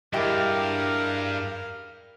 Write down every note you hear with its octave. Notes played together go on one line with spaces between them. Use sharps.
G2 G#3 E4 G4 A#4 F5